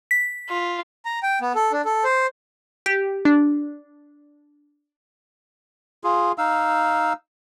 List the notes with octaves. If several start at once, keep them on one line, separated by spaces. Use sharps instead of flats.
B6
F4
A#5
G5
B3
A4
D4
A4
C5
G4
D4
F4 G#4
D#4 F5 E6